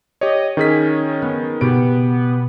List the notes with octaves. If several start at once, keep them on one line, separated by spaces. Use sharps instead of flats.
G4 C#5 D#5
D#3 C#4 G#4 B6
B3
B2 B3 G4 D7